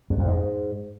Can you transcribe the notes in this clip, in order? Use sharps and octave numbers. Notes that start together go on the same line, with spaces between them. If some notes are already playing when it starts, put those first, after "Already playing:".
F#2
F2
G#2